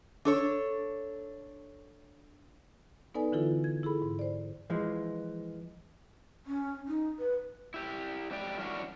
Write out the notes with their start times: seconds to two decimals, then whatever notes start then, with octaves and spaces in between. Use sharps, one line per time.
0.25 D4 A4 C#5
3.15 B3 D#4 A4 B4 D5 G#5
3.32 D3 E3 E4 F4 A4
3.64 G#6
3.83 E4 G#4 A4 B5
4.02 G#2
4.19 C5 D5
4.70 E3 F3 G#3
6.46 C#4
6.88 D#4
7.19 B4
7.74 E4 G4
8.31 F2 F#3 G#3 G4 D5 G5
8.57 E3 G3 C#4 D4 F#4